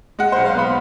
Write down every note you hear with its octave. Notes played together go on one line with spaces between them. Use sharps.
G#3 F#5
B1 C5
F5
B3 B5